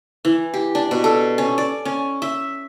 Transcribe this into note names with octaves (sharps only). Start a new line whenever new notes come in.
E3
G4
D4
B2
A4
C#4
D5
C#4
E5